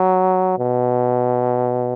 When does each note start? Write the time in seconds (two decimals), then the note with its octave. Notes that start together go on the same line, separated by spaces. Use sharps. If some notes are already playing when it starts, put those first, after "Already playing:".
Already playing: F#3
0.59 B2